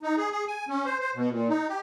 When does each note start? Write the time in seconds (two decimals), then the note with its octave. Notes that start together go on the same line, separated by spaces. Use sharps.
0.03 D#4
0.17 G#4
0.31 G#4
0.47 G#5
0.69 C#4
0.85 C5
1.00 C5
1.15 B2
1.30 A#2
1.49 D#4
1.68 G4